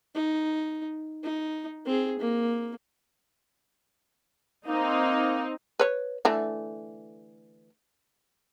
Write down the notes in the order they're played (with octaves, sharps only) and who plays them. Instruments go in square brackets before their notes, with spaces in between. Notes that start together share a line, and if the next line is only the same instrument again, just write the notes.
[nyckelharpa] D#4
D#4
C4 G#4
A#3
[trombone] A#3 [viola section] C4 D#4
[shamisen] B4 C#5
D3 E3 A3